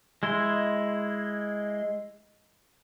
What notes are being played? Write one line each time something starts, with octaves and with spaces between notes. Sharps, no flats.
G#3 E4 C6